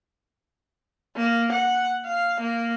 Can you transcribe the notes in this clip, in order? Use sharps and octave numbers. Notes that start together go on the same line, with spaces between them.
A#3
F#5
F5
A#3